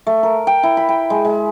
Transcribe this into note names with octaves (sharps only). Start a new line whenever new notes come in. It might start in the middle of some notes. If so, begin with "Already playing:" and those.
A3
A#4
G5
E4
B5
G5
G#3
G#3